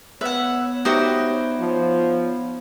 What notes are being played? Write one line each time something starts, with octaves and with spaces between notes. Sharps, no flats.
B3 B4 C#5 E5 F#5
D#4 F#4 G4 C5 D5 E5
F3